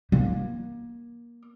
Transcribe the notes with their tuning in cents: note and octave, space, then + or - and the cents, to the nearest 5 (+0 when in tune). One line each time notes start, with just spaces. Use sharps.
A#3 +25